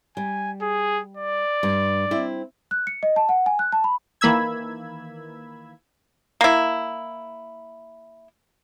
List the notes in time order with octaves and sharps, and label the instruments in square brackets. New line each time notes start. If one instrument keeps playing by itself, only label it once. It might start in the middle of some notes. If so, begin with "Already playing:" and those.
[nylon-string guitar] G3 [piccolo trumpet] G#5
[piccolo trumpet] G#4
D5
[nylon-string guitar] G2
C4 E4
[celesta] F#6
C#7
D#5
A5
F#5
G#5
F#6
A5
B5
[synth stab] D#3 E3 A#3 B5 E6 G#6
[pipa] A#3 E4